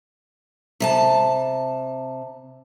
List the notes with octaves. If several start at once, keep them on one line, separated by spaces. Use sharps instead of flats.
C3 D5 A5